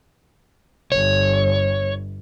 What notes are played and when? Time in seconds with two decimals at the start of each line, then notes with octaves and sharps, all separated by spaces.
0.92 G1 C#5